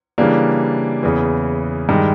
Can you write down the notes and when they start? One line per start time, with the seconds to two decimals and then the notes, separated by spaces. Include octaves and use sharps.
0.18 C#3 E3 G3 A#3 D4
1.03 E2 C#3 E3
1.89 G2 D#3 G#3